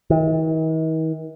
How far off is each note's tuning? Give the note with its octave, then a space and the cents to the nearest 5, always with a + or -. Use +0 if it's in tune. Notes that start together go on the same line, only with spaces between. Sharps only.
D#3 +45